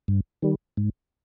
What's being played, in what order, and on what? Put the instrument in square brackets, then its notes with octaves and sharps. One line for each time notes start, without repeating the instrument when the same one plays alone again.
[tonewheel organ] G2
D#3 G3
G#2